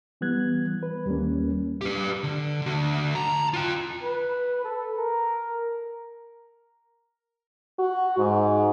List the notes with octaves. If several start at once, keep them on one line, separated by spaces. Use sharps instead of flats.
E3 G3 B3 F#6 G#6
B4
D#2 G3 A#3 C#4
G4 B4
D3
D3 F#4
A5 A#5
F4 G5
B4
A4
A#4
F#4
G#2